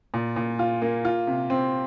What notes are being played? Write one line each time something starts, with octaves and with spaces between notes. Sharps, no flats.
A#2
A#2
F4
A#3
F4
C3
C4